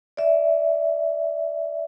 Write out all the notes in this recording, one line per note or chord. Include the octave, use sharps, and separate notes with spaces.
D5 E5